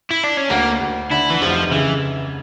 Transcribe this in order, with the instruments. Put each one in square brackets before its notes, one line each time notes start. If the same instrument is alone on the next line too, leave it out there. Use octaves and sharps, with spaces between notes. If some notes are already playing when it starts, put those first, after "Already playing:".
[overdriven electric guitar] E4
D4
C#4
[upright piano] D2 [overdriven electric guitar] A#3
[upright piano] D2
[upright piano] D3 [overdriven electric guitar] E4
[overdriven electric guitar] E3
[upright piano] F1 [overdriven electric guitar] F3
[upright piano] C#3 [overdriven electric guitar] E3